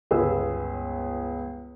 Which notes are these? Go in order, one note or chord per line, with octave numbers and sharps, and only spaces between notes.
G1 C#2 G#4 B4 E6